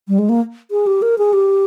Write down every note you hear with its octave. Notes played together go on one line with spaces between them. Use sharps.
G3
G#3
A#3
G#4
G4
A#4
G#4
G4